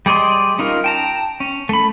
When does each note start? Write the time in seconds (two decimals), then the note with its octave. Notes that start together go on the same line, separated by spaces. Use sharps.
0.06 G3 G#4 D5 D#5 C6
0.59 C#4 D#4 F4 A#4
0.84 G5 A5 A#5
1.40 C#4
1.69 A3 B5